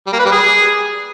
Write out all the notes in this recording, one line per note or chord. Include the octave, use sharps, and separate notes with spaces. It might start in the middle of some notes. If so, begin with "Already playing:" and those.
G3
A#3
B4
G3
G#4